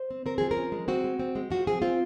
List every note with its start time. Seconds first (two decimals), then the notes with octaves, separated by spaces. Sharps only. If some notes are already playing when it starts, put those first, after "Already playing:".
Already playing: C5
0.11 C4
0.26 C4 A#4
0.38 F3 G#4
0.51 A#4
0.57 C#4
0.72 G#3
0.88 C4 F#4
1.04 G#3
1.19 C4
1.35 G#3
1.50 F3 F#4
1.67 C4 G#4
1.82 C4 F4